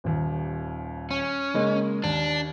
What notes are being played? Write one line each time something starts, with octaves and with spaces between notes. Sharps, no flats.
D#1 D#2
C#4
C#3 G#3 A#3
D#2 D4